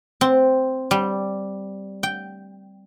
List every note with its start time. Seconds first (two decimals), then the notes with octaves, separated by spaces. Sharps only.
0.21 C4
0.91 G3
2.03 G5